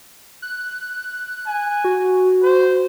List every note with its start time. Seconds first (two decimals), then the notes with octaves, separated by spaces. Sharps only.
0.42 F#6
1.46 G#5
1.85 F#4
2.43 C5